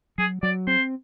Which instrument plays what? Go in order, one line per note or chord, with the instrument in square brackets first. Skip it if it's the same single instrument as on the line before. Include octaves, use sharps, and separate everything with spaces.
[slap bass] F#3 [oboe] G#4
[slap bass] F#3 [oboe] D5
[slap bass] C4 [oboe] C5